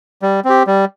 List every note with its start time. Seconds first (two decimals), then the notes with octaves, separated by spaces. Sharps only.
0.22 G3
0.45 C4 G4
0.67 G3